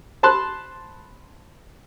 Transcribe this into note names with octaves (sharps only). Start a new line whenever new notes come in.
C5 A5 B5 C6 F#6